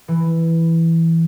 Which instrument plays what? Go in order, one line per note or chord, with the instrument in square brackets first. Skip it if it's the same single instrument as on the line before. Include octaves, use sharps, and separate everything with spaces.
[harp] E3